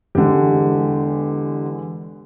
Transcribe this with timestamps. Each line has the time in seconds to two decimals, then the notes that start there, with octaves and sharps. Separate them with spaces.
0.15 E2 D3 G#3 G4